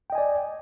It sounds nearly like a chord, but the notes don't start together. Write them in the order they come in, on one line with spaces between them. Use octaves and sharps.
G5 D#5 G#5 D5